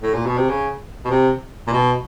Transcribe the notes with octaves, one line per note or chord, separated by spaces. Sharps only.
A2
A#2
B2
C3
C#3
B2
C3
A#2
B2